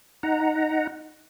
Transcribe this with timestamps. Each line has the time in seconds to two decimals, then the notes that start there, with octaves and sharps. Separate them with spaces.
0.23 D#4 F#5 A#5